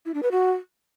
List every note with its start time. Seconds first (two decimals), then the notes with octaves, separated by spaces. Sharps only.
0.06 E4
0.14 D4
0.23 B4
0.31 F#4